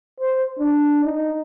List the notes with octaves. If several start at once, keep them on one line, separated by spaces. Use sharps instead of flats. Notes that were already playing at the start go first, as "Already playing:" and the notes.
C5
D4
D#4